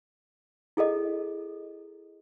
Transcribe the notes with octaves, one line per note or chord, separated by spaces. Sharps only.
E4 G#4 A4 D#5